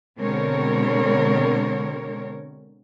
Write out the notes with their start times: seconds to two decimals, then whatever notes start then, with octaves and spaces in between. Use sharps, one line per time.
0.18 B2 D3 G#3 C4 A#4 C#5